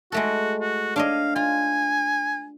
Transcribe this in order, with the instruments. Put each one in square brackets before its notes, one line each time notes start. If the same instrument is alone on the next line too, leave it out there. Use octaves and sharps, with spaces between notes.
[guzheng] G#3 A3 A4 [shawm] F#4
[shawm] F#4
[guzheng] D4 C#5 D#5 [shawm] F5
[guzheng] F4 [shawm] G#5